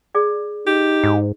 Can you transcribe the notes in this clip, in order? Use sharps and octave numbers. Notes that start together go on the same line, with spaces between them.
G#4 D5
D#4 G4
G#2